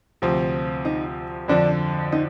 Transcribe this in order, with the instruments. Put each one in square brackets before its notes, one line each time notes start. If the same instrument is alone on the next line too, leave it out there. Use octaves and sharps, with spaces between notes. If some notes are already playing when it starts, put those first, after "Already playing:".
[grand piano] D2 C3 F3 C4
[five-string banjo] D#4
[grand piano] F2 D3 F3 [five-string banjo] D4
[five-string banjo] D#4